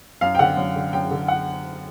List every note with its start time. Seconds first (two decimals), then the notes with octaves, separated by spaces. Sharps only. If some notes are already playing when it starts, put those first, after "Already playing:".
0.21 F#2 F5
0.35 G5
0.39 D3 F#5
0.57 F#2
0.76 D3
0.93 F#2 G5
1.11 D3
1.28 F#5